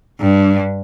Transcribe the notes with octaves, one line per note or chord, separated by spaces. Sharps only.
G2